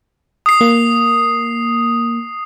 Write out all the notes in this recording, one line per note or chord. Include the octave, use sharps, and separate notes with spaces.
D#6 C7
A#3